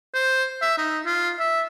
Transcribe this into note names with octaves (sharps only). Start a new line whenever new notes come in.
C5
E5
D#4
F4
E5